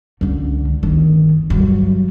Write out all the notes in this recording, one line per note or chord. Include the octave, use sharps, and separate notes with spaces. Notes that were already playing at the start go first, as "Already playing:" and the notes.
C#2 D3
G1 D#3
G2 F#3